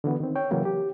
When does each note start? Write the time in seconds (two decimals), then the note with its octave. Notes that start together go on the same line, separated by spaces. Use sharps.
0.04 D3 E3 B3 F#4
0.20 D#3 C4
0.35 C#5 G5
0.51 C#3 E3 F#3 A#3
0.65 G4